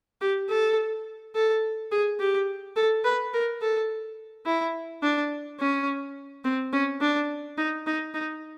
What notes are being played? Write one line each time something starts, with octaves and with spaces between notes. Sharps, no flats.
G4
A4
A4
G#4
G4
A4
B4
A#4
A4
E4
D4
C#4
C4
C#4
D4
D#4
D#4
D#4